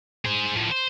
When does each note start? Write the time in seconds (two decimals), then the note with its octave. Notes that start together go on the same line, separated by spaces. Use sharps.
0.25 G#4 C5
0.56 A2 F3
0.71 C5